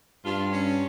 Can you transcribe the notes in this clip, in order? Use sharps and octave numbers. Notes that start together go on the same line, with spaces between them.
G2 F4
C#4